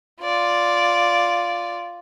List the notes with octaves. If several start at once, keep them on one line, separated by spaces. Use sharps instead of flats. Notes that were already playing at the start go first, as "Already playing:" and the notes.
F4 D5